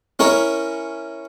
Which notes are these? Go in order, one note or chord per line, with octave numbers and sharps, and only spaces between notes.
C#4 E4 A#4 C#5